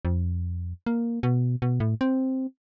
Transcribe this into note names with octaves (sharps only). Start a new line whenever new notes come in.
F2
A#3
B2
B2
A2
C4